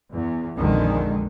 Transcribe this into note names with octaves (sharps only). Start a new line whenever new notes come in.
E2
A#1 F2 D3 D#3 G#3